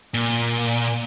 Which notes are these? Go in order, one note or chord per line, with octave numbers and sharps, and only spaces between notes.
A#2